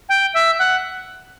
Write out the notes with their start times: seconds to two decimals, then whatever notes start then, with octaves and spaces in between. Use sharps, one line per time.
0.09 G5
0.34 E5
0.59 F#5